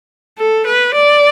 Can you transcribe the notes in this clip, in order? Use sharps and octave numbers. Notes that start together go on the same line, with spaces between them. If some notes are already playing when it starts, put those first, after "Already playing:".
A4
B4
D5